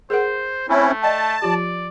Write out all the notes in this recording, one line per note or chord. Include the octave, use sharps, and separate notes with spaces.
G#4 A#4 C5 F#5
A3 C4 C#4 E4
D5 D#5 G5 A5
F3 F4 G4 D5